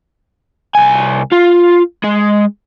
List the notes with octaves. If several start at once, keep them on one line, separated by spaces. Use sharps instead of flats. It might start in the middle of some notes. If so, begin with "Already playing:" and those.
C2 G#5
F4
G#3